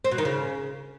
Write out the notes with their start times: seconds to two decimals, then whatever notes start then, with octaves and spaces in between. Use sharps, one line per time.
0.05 C4
0.11 B2
0.18 D#3
0.25 C#3